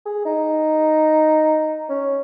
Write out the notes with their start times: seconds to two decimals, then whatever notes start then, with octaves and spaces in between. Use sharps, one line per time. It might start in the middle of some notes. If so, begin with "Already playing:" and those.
0.06 G#4
0.25 D#4
1.89 C#4